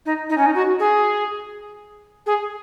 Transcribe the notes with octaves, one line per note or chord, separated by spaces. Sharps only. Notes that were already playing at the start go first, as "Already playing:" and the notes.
D#4
D#4
C#4
D#4
F#4
G#4
G#4